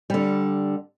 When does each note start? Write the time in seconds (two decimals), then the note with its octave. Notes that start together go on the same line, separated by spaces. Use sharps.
0.10 D3 G3